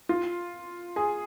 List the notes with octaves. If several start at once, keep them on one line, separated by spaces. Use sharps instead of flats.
F4
G#4